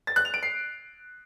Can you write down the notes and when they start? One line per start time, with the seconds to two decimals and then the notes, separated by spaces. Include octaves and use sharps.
0.07 A6
0.16 F#6
0.25 F7
0.34 D7
0.43 C7